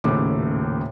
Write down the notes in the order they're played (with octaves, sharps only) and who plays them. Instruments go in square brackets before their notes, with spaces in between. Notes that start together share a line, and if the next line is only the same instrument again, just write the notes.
[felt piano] D#1 D#2 A2 C#3 A3 D6